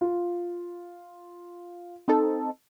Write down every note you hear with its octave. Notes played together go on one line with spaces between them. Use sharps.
F4
C4 D#4 A4